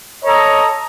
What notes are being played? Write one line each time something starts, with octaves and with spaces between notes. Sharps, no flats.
A4 C#5 D#5 A#5